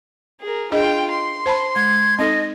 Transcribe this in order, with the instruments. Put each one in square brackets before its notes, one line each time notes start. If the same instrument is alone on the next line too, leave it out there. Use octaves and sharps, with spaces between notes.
[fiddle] G#4 A#4
[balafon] D4 G#4 D#5 [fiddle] F4 G5
[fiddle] C6
[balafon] C5 A5 B5
[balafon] G#3 [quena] G#6
[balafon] C4 D#4 A4 [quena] D#5